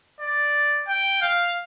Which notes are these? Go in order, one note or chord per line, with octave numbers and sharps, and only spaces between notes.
D5
G5
F5